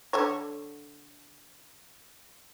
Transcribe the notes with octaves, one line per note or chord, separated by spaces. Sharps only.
D3 A4 C#5